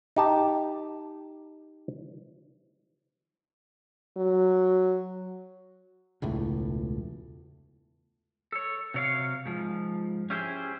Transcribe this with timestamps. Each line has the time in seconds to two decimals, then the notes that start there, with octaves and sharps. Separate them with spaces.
0.16 D#4 G4 A5
4.17 F#3
6.22 E1 C#2 A2
8.52 A4 C#5
8.94 C3 F#3 C#5 D5 F5
9.46 G#2 F3
10.30 C#4 E4 G4 G#4 C5